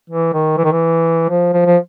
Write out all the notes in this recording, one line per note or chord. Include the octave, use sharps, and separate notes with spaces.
E3
D#3
E3
D#3
E3
F3
F3
F3